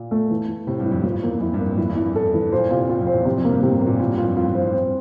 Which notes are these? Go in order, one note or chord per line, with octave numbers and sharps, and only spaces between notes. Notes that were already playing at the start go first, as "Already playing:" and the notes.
Already playing: A#2
A3
E3
E3
A2 C3
G2
E4
F2
F2 F3
E2 A#3
F2 E4
G2
A#3
A2
F2 E4
E2
E4
G2
A4
E3
A#2 C5
C3 F4
A2 F4
F2
C5
E2
F2 C3
F2
A#3
G2
A2 C3
A#3
A#2
A2 F4
G2
F4
F2
F2 F4
F2
C5
E3
C4